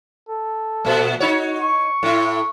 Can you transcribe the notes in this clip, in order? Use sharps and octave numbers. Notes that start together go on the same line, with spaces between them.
A4
A#2 A3
D#4 F#4 C#5
C#6
A2 E4